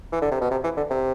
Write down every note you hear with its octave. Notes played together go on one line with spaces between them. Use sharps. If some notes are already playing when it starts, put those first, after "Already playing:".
E3
D3
C3
B2
C3
E3
D3
C3